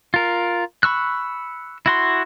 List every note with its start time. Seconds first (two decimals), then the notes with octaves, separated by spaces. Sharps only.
0.14 F4 A#4
0.83 B5 C#6 E6 F#6
1.86 E4 F#4 C6